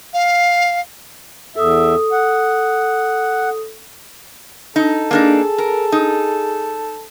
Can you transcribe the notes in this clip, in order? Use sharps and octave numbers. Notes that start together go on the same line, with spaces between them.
F5
E2 A4 E5 D#6
F#5
D#4 A4
A#3 D4 D#4 G#4
A#4
D#4